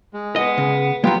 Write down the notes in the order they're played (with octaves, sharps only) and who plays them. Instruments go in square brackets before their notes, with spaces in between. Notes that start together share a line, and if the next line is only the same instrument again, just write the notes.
[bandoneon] G#3
[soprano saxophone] B3 [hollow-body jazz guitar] D#5
[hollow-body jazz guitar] C#3
[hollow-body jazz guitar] F#3 G#3 [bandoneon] B3 F4 [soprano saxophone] G4